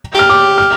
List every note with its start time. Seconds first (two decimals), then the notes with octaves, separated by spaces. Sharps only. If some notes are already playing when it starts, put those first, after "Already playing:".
0.15 G4 F6
0.29 D6
0.58 F6